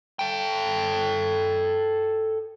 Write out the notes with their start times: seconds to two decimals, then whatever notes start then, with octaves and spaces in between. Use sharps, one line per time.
0.19 A4 G5